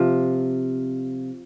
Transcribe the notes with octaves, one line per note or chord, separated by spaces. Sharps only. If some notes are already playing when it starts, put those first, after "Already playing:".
Already playing: C3 F3